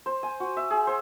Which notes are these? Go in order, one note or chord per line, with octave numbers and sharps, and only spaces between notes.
C5
G#5
F#4
E5
G#4
C5